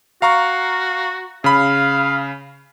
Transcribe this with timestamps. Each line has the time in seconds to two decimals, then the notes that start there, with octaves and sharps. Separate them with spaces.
0.22 F#4 F5 A#5 C#6
1.44 C#3 F5 B5